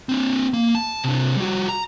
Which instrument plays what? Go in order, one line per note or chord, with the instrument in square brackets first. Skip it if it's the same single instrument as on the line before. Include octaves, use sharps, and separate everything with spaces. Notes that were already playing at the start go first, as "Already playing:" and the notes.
[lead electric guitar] C4 D4
A#3
A5
C3 D4
G3 F#4
A#5